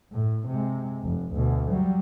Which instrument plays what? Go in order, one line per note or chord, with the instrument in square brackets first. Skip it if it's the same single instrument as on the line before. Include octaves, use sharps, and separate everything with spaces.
[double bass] A2
C3 G#3
F1
D2 B2
F#3 G3